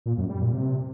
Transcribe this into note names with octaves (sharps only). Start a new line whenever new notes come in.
A#2
F#2
G3
A#2
C3